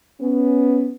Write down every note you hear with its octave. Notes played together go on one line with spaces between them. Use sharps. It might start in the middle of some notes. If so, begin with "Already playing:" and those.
B3 C#4